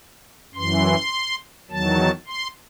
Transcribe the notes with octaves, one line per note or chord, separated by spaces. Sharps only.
F#2 E3 C6
E2 D#3 F#3 A5
C6